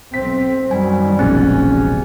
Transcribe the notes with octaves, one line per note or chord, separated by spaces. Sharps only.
B1 C4 C5 B6
F#2 D#3 F#3 G3 G#5
E1 A#1 C4 C#4 G#4
C3 F3